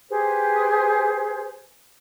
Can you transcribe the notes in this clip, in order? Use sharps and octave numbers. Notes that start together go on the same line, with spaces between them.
G4 G#4 B4 C5